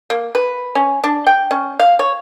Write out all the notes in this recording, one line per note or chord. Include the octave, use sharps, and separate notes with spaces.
A#3
B4
C#4
D4
G5
C#4
F5
C#5